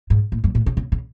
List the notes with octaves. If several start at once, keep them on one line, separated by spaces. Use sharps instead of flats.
G#2
A2
F#2
A2
C#3
C#3
C#3